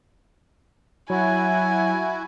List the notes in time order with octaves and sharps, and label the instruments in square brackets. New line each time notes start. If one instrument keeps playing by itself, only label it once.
[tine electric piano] F#3 [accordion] E4 F#4 [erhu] G#5